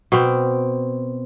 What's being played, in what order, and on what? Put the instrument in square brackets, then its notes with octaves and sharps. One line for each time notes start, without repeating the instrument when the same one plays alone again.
[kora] B2 C4